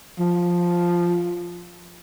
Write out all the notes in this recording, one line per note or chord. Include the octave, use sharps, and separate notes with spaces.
F3